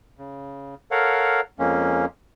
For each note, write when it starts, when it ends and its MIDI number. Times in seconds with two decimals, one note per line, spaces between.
0.19 0.75 49
0.91 1.41 69
0.91 1.41 70
0.91 1.41 73
0.91 1.41 77
0.91 1.41 78
1.59 2.05 41
1.59 2.05 56
1.59 2.05 58
1.59 2.05 61